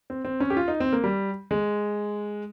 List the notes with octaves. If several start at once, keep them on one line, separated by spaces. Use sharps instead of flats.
C4
C4
C#4
G4
F4
D#4
C4
A#3
G3
G#3